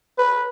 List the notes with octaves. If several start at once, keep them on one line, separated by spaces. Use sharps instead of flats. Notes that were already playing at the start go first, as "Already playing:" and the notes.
B4